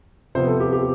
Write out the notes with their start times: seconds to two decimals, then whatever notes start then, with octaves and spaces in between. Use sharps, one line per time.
0.35 C3 F3 B3 C5
0.47 A4
0.60 G4
0.73 G4